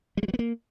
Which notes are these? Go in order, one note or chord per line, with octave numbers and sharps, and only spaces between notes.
G3
G#3
F#3
B3
A#3